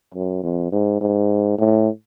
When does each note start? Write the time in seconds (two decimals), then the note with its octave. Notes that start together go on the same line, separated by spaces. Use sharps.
0.14 F#2
0.43 F2
0.72 G#2
1.01 G#2
1.59 A2